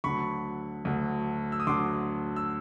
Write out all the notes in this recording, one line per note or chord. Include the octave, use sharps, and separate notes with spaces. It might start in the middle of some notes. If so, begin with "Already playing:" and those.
D2 D3 F#3 B5 C#6
D2 D3 F#3
E6
D#6
D2 D3 F#3 C6 D6
E6